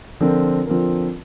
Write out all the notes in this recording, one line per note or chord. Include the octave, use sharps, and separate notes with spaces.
D3 F3 C4 F4 A#4
D3 F3 C4 F4 A#4